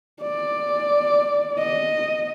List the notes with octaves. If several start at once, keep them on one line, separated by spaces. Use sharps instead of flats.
D5
D#5